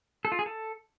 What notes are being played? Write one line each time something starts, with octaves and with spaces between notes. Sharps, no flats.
A4
F4
G#4
A4